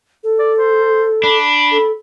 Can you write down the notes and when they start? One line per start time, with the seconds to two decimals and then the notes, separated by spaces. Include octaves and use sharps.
0.24 A4
0.39 D5
0.58 C5
1.23 D4 B5
1.71 A4